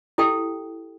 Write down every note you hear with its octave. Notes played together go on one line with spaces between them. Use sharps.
E4 G4 A4 G5